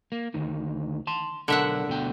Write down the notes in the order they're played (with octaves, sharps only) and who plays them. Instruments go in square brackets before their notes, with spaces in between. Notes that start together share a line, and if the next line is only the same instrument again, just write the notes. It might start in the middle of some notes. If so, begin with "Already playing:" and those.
[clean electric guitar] A#3
D2 D#3
A5 C6
[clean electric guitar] B1 A#4 [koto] D3 E5 F#5
[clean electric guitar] D2 B2 G5